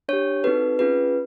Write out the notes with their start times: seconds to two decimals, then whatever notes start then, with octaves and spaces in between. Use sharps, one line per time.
0.08 D4 G4 C#5
0.44 C4 D#4 F#4 A4 B4
0.79 C#4 F4 G#4 B4